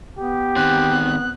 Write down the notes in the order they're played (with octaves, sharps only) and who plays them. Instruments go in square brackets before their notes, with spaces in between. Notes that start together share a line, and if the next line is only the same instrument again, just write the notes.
[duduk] B3 [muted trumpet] G4
[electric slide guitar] D#3 C4 [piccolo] F#6